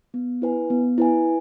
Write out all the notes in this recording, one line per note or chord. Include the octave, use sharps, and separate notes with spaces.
B3
E4 B4 G#5
B3
E4 B4 G#5